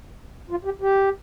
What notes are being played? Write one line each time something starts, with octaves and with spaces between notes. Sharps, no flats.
F4
G4
G4